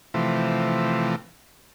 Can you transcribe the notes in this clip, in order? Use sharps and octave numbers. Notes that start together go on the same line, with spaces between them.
C3 E3 F3 A3